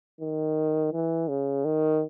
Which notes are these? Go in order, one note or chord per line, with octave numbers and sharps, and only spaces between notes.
D#3
E3
C#3
D#3